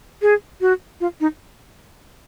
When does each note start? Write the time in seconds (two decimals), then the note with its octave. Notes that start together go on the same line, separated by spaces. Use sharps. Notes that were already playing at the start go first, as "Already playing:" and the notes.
0.22 G#4
0.61 F#4
1.01 F4
1.20 D#4